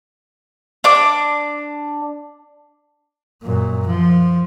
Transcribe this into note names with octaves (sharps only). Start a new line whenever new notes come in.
D4 D6
F#2 A#2
F3